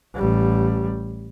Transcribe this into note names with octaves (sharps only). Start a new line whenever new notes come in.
A1 G3